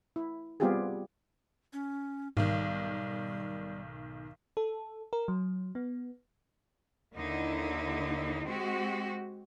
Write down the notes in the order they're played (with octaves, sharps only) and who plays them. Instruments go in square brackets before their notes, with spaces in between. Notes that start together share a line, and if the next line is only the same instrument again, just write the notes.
[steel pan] E4
G3 B3 C4 F4 G4 G#4
[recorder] C#4
[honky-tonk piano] B1 D#3 [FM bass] G#2 [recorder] G3
[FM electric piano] A4
A#4
F#3
B3
[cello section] D#2 D3 D#4 E4
G#3 C4 F#4 G4